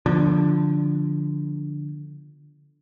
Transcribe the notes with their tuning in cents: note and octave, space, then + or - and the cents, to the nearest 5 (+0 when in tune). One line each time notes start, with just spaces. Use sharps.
D3 +0 F3 +0 B3 -30